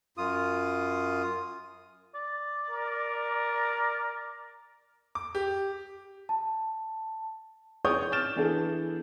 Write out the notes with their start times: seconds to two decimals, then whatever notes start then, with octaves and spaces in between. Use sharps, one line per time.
0.18 F#2 F4 D#6
2.15 D5
2.70 A#4
5.15 D6
5.35 G4
6.29 A5
7.85 G#4 C#5 D5 C#6 D#6 G6
8.12 F6 G6 A6 E7
8.36 E3 B3 D4 G#4 A4